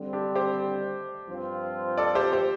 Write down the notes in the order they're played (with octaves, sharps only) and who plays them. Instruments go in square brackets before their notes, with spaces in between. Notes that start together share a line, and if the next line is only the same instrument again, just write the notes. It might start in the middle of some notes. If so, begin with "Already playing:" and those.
Already playing: [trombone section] D3 G3 C4
[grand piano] D4 G4
G4 C5
[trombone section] G2 F3 C4 F4
[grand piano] A4 D5
G4 C5
G4 C5